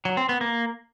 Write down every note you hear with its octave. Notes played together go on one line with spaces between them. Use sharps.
F#3
C4
B3
A#3